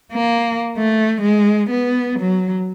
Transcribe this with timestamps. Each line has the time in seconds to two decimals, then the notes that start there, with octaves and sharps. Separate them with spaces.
0.12 A#3
0.77 A3
1.22 G#3
1.70 B3
2.20 F#3